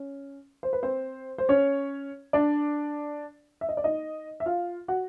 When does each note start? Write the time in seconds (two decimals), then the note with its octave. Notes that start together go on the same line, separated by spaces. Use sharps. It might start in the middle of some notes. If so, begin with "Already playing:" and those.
Already playing: C#4
0.63 C5
0.73 B4
0.82 C4 C5
1.38 C5
1.49 C#4 C#5
2.33 D4 D5
3.61 E5
3.69 D#5
3.77 D5
3.84 D#4 D#5
4.40 E5
4.46 F4 F5
4.88 F#4 F#5